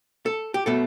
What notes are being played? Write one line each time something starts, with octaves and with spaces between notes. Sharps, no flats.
A4
G4
B2 A3 A4